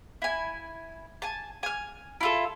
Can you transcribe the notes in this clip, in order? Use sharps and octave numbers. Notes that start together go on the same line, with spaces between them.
E4 G#5
G#5 A5
G#5 F6
E4 F4 A4